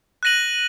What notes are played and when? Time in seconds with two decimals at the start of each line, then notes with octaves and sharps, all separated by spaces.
0.23 F#6 A#6 D#7 F#7